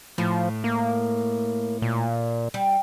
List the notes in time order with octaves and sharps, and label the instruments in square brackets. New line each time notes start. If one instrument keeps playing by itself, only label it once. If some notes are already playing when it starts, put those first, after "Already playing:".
[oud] A2 [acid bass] F3
[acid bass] A#3
A#2
[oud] G3